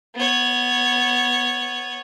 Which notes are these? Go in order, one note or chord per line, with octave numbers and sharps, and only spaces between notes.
B3 C#5